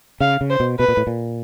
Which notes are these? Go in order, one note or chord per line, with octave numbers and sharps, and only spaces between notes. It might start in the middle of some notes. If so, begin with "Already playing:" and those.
C#3 F5
C#3
C5
B2
B2 B4
A#2
A2
A#2